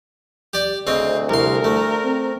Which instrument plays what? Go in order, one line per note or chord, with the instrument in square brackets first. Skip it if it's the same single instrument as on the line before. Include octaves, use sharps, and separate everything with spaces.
[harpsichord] G4 D5
[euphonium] D2 [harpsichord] C#3 C4 D#5
[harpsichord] C2 C6 [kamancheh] A#4
[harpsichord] A3
[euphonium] C4